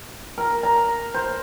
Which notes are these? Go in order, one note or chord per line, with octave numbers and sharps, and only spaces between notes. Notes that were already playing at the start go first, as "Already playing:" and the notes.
A#4
A#5
C5